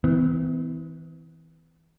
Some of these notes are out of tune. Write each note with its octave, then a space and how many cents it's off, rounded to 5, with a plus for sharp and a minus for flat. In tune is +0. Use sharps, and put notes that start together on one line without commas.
E3 -30 B3 +45